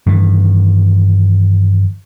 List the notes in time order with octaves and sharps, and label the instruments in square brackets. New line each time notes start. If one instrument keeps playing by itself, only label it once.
[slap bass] G2 D#3 E3